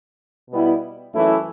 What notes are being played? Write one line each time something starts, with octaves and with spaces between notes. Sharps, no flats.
B2 G3 B3 E4
F#2 E3 A3 E4